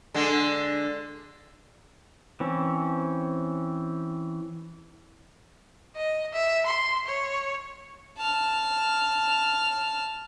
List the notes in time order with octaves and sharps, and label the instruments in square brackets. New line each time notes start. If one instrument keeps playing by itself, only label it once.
[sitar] D3 G#3
[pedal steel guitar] E3 C4 C#4
[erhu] D#5
E5
C6
C#5
[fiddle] A5 F6